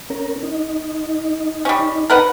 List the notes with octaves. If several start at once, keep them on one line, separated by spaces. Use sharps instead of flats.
C#4 A#4
D#4
G3 C#4
A#4 B4 F#5